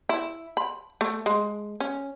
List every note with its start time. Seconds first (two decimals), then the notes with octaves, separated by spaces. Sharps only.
0.09 E4
0.57 B5
1.01 A3
1.26 G#3
1.80 C#4